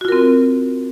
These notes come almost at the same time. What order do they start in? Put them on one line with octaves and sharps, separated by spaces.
F#4 F4 A#4 C4